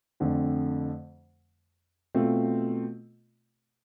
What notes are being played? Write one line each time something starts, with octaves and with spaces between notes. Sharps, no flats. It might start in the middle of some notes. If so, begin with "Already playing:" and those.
F2 D3 A3 C4
B2 A3 C4 F4